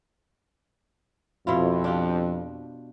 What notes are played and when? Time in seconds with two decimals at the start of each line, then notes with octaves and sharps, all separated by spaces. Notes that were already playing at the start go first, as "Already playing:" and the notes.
1.47 F2 B2 E4 F4
1.84 D4 F4 G4